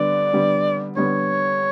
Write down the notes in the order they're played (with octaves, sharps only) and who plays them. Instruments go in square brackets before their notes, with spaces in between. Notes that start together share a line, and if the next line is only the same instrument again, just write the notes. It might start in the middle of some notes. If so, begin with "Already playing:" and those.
Already playing: [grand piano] D3 G3 B3 [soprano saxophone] D5
[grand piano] D3 G3 B3
[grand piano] D3 G3 B3 [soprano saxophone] C#5